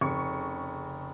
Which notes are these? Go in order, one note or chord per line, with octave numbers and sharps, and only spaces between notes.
F1 C#3 C#6 C#7